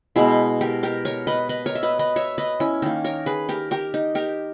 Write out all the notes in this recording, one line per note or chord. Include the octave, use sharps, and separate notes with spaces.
B2 G#3 B3 E4 G#4
G4 A#4
G4 A#4
A#4 C#5
B4 D#5
B4 D#5
A#4 C#5
E5
B4 D#5
B4 D#5
C#5 E5
B4 D#5
C#4 E4
D#3 A#3 D#4
A#4 C#5
G#4 B4
G4 A#4
G4 A#4
D#4
G4 A#4